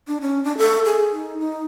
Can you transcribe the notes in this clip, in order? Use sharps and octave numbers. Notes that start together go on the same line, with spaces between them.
D4
C#4
D4
A4
G#4
D#4
D#4